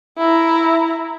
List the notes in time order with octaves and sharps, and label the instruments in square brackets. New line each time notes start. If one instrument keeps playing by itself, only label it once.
[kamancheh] E4 A#5